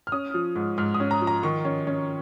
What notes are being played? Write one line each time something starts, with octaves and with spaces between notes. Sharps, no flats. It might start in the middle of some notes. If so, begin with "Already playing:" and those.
F6
C#4 D#6
F3
G#2
G#2 F6
D#6
C#4
A#5
F3
A#5
D#3 C#6
C#4
C#4